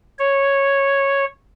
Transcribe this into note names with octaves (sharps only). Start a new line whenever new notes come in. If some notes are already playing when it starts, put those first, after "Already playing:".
C#5